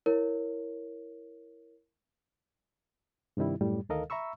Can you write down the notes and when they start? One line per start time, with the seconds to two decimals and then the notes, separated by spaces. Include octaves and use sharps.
0.06 E4 A#4 C#5
3.37 G2 C3 D#3 G3 E4
3.61 F#2 A2 G3
3.89 D2 D#3 A4 A#4 D#5 F5
4.10 E5 A#5 B5 C#6 E6